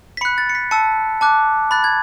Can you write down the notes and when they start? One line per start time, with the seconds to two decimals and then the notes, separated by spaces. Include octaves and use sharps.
0.17 B6
0.21 B5 C#7
0.25 F#6
0.38 A6
0.50 C#7
0.55 B6
0.71 A5 E6 C#7
1.21 A5 D6 F#6
1.71 B5 F#6 A6
1.84 G#6